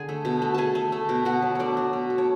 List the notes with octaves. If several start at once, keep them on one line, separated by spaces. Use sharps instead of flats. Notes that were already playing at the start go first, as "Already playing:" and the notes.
Already playing: D3 G#4 G#5
A3
B2
A3
A3 G#4 G#5 A5
A3
A3
B2
B2 F#4 F#5
F#3
A3 D4 C#5 D5
F#3
B2
A3
C#5